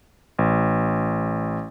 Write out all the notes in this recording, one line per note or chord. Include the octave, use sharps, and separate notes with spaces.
A1